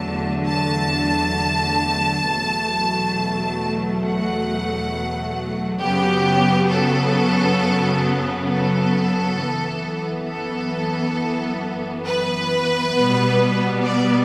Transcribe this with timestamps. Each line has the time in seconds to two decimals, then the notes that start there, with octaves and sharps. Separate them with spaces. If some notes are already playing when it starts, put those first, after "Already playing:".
Already playing: E2 D3 F#3 A3 A5
0.47 A5
2.24 E2 B2 F#3 A3
4.03 F#5
5.82 F#2 C#3 F#3 B3 G4
6.71 A4
8.48 A4
9.38 F#2 E3 B3
10.27 A4
12.06 B4
12.94 B2 G3 B3
13.84 D5